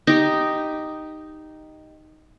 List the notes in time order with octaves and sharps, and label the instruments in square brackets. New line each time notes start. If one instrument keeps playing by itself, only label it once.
[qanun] D#4 G4